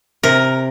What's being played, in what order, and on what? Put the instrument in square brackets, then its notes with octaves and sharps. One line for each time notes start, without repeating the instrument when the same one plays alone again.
[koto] C3 A#4